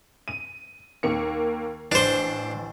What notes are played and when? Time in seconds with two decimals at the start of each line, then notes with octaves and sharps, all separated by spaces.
0.28 D#7
1.03 D#2 A#3 C#7
1.92 A1 D4 C5